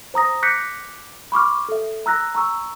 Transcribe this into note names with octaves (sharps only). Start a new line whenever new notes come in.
C5 A#5 D#6 A#6
D6 F#6 G6 A#6 B6 C#7
B5 C#6 D6 F6
A4 E5
A#5 E6 F#6 A#6
A#5 C#6 E6